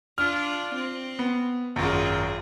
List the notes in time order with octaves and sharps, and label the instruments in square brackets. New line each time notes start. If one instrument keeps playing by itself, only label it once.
[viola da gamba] D4 F4 [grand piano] F6
[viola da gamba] C4
[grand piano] B3
[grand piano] G#1 F#2 [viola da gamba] F4 G#4